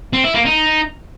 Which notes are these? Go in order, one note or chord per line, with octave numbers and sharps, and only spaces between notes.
C4
E4
A#3
D#4